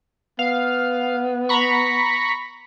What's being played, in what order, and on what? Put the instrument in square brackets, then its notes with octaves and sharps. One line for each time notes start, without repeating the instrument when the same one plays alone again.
[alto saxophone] B3 [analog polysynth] F5
[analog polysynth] A#5 B5 C#6